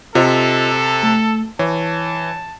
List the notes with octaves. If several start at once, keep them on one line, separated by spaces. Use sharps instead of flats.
C3 F4 A4 C5 D#5
A3
E3 C#5 A5